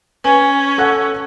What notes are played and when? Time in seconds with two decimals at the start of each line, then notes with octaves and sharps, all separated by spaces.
0.24 C#4 B4 G#5
0.78 A4 F#5 F#6